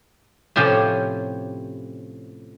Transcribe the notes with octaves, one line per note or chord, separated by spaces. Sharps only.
A2 C3 F3 C#4 G4